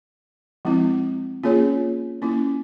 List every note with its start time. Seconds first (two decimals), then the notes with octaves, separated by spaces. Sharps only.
0.65 F3 G#3 C4 E4
1.43 A#3 C#4 F4 G#4 C#5
2.22 A#3 C#4 E4